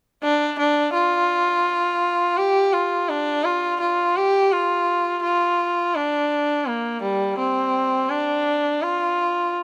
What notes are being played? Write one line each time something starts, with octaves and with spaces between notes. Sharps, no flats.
D4
D4
F4
G4
F4
D4
F4
F4
G4
F4
F4
D4
A#3
G3
C4
D4
F4